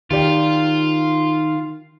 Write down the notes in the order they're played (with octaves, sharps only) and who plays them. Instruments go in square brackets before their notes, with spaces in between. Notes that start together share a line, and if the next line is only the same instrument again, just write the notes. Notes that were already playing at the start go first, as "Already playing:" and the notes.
[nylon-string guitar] D#3 G4 D5 [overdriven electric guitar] F4